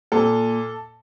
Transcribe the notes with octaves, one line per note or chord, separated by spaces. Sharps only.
A#2 A4